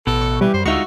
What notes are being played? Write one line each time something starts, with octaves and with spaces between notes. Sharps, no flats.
A1 B2 A4
C#6
E3 G3
F#2 C5
D2 G#3 D#4 F4 F#4 E5 C#6